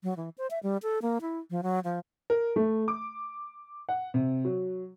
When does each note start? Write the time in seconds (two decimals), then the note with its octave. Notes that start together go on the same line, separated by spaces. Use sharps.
0.03 F#3
0.17 E3
0.38 C5
0.51 E5
0.63 G3
0.83 A4
1.02 A#3
1.21 E4
1.50 F3
1.63 F#3
1.84 F3
2.30 A#4
2.56 A3
2.88 D6
3.89 F#5
4.14 C3
4.45 F#3